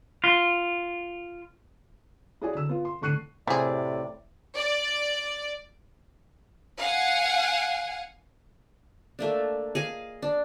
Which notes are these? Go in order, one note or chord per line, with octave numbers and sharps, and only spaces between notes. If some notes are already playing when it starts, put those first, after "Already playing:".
F4
E4 F#4 G#4 C#5 D5 G#5
D3 E6
B3 F4
C6
A2 D3 C#6 F#6 C7 D#7
A2 C3 G3 G#4 D5
D5
F5 F#5 G#5
A3 A#3 D4
G#4 D#5 F5
D4